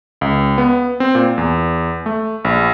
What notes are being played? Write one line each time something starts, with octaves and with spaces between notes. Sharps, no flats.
C#2
B3
C4
A#2
E2
A3
A#1